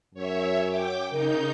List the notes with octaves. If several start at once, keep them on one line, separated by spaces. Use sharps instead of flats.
F#2 C#5 E5
G5 D6
C#3 D#4 A#4 G6